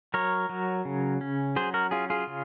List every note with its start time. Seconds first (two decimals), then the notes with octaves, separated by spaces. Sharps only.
0.14 F#3 A#4 C#5
0.49 F#3
0.85 C#3
1.21 C#4
1.56 F#3 G#4 C5
1.74 F#4 A#4
1.91 C#4 F4 G#4
2.10 F4 G#4
2.27 C#3